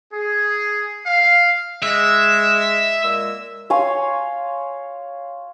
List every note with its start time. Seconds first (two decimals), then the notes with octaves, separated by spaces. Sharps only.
0.13 G#4
1.05 F5
1.82 G#3 E5
3.03 A#2 G#3 E6
3.70 C#5 F5 G#5 C6